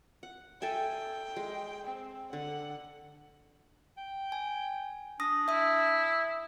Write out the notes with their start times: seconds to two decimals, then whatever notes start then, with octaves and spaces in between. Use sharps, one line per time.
0.23 F#5
0.62 A4 E5 G5 G#5
1.36 G#3
1.87 C4
2.33 D3 F#5
3.97 G5
4.32 G#5
5.20 D4 D#6 A#6
5.48 E4 E5 D#6